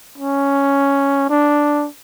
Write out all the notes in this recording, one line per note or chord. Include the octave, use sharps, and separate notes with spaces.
C#4
D4